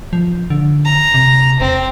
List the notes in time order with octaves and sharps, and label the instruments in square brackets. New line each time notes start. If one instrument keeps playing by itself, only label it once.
[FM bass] F3
D3
[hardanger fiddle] A#5
[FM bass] C3
[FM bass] E1 [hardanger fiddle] C4